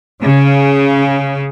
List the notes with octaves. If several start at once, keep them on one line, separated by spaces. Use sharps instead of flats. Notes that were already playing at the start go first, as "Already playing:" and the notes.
C#3